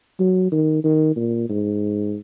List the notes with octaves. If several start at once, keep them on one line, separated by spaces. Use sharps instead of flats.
F#3
D#3
D#3
A#2
G#2